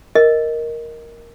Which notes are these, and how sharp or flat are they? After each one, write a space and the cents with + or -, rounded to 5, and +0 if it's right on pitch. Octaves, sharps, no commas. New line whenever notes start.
A#4 +0 D#5 +5